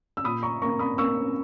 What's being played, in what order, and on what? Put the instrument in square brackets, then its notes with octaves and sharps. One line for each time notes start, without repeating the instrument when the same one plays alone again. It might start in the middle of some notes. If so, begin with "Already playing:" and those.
[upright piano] E6
A#2 B5 D#6
A#5 C#6
A#3 A#5 C#6
B5 D#6
A#3 C#6 E6